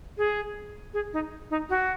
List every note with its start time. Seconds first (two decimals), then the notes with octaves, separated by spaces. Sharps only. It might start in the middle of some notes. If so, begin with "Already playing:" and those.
0.18 G#4
0.93 G#4
1.13 D#4
1.50 D#4
1.70 F#4